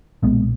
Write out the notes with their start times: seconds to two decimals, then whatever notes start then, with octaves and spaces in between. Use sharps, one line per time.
0.23 B1 A#2 G#3 B3